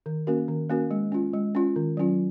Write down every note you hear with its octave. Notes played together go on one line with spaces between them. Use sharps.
D#3
A#3 C#4 F#4 A#4
D#3
A#3 C#4 F#4 A#4
G#3
C#4 F4
G#3
C#4 F4
D#3
F#3 C#4 F4